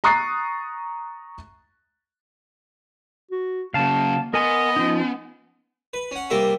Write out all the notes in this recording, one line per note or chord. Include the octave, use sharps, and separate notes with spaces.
A#5 C#6 D#6 F#6 A6 C7
F#4
C#3 F#3 A#3 F5 A5
B3 A#4 D#5 G#5 C6
F3 C#4 D#4
B4
C#4 F#5
C3 G3 A#3 A#4 E5